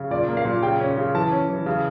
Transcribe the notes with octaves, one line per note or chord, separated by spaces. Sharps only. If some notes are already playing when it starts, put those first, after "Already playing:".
Already playing: C#3
A#2 D5
A#3
F5
A#2
C#3 G5
C#4
C#3
E3 A5
C#4
E3
C#3